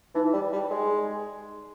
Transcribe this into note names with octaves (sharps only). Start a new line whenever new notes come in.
E3 D#4
G3
G3
G#3